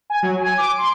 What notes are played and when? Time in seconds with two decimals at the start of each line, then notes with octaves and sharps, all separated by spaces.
0.10 G#5
0.23 F#3
0.41 G#5
0.58 D6
0.78 C6